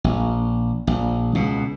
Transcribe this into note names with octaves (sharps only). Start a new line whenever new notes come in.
A#1
A#1
C#2 B2